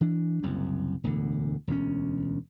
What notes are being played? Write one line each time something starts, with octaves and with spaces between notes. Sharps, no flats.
E3 D4
F#1 C2 F#2
E1 D2 A2 D3
E1 D2 G3 C#4